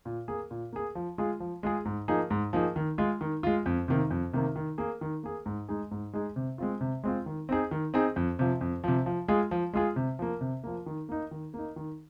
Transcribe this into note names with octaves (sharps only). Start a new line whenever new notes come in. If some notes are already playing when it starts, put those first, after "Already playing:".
A#2
A#3 G#4
A#2
A#3 G#4
F3
G#3 F4 G#4
F3
G#3 F4 G#4
G#2
F3 A#3 D#4 G#4
G#2
F3 A#3 D#4 G#4
D#3
G#3 F4
D#3
G#3 F4
F2
C3 D#3 A#3
F2
C3 D#3 A#3
D#3
A#3 G#4
D#3
A#3 G#4
G#2
G#3 D#4 G#4
G#2
G#3 D#4 G#4
C3
G#3 C4 F4
C3
G#3 C4 F4
D#3
C4 D#4 G#4
D#3
C4 D#4 G#4
F2
C3 F3
F2
C3 F3
F3
G#3 F4 G#4
F3
G#3 F4 G#4
C3
F3 A#3
C3
F3 A#3
D#3
A#3 D#4
D#3
A#3 D#4
D#3